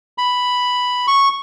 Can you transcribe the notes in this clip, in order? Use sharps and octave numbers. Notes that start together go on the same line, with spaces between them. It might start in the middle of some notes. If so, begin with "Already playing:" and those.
B5
C#6